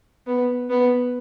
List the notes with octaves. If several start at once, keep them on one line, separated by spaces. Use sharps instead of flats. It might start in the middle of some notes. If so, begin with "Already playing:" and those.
B3
B3